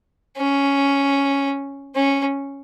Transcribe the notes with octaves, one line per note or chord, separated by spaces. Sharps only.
C#4
C#4